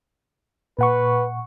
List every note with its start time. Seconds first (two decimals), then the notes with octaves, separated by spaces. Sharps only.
0.79 A#2 B4 F#5 C#6